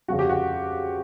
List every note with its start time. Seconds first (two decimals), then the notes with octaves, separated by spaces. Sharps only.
0.08 F2 C#3 F3 F#4
0.19 G4
0.29 F#4